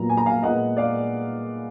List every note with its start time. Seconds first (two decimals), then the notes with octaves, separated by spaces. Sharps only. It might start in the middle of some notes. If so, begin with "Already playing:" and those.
Already playing: A#2 F#3 B3 A#5
0.09 G#5
0.17 A#5
0.26 F5 G#5
0.42 A#2 G#3 B3 D#5 F#5
0.77 D5 F5